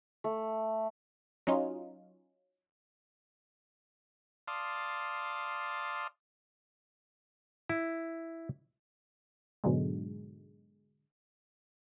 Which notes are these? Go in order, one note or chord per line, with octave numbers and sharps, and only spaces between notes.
A3
F#3 C#4 D#4 F4
D5 F5 A5 C6 D#6
E4
G#2 B2 D3 F#3 G#3